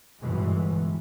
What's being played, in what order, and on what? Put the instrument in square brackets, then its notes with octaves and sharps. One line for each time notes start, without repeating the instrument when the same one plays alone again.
[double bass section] G1 B2 E3 G#3